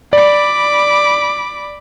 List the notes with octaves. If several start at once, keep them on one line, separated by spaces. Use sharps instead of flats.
D5 B5 D6